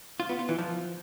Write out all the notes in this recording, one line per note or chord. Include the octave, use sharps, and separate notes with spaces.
F4
B3
F4
E3
F3